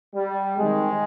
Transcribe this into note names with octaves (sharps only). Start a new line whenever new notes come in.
G3
C3 D#3 G#3